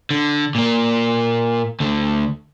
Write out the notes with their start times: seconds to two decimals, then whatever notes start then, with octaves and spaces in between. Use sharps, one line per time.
0.11 D3
0.55 A#2 A#3
1.80 D2 D3